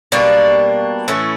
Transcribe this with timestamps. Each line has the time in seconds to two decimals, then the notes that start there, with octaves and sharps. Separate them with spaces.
0.12 B2 G3 A#3 D4
1.08 A2 E3 A3 C#4